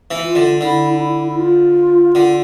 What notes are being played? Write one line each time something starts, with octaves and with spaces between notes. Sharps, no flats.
E3
F4
D3
D3 E4
D4
E4
E4
F4
D3